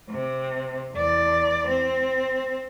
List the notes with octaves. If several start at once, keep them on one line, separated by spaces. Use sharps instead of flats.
C3
E2 D5
C4